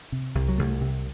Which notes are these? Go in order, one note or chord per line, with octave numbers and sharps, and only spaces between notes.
C3
C2
F#3
C2 A3
C3